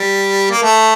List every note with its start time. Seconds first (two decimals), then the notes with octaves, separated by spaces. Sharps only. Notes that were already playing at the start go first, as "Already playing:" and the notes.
Already playing: G3
0.51 A#3
0.63 A3